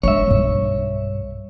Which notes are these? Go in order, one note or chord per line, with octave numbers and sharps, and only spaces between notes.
G2 G#3 C#5 E5
B1 G2